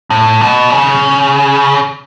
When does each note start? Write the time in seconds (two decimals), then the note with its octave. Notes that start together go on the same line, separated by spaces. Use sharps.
0.10 A2
0.41 B2
0.70 C#3